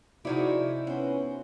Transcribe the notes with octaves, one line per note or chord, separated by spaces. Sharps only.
G#2 C3 F3 D#4 E4 F#4 C#5 D5
B3 C#4 F#4 C5